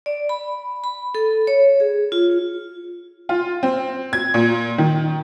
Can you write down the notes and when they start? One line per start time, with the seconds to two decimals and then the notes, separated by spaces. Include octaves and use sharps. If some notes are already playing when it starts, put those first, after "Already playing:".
0.06 D5
0.29 B5
0.84 B5
1.15 A4
1.47 C#5
1.80 G#4
2.12 F4
3.29 F4
3.63 C4
4.13 G#6
4.34 A#2
4.78 D#3